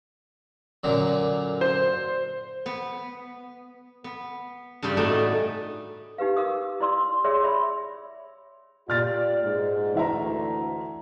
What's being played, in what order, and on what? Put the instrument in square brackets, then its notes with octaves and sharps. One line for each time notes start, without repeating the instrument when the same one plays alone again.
[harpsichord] F#2 A#2 D3
[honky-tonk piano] C5
[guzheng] B3
B3
G2 C#3 G3 G4 G5
A2 A3 D4 D#4 F#4 G#4
[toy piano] D#4 G4 B4 F5
A#4 F5 D6 D#6
E4 D5 C6 E6
G#4 C#5 D5 E5 C6 E6
D5 E5 B5
[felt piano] A#2 F6 A6 [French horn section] F4 G4 D5
[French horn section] G#2
[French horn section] D2 [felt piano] E3 E5 A#5